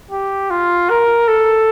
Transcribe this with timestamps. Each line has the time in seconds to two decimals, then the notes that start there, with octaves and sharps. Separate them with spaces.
0.11 G4
0.50 F4
0.90 A#4
1.28 A4